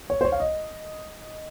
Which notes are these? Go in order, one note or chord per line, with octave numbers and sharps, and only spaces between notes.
C#5
C5
C#5
F5
D#5